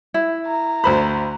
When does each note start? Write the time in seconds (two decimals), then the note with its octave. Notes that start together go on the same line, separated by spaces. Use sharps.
0.14 E4
0.47 A#5
0.84 D2 C5 B5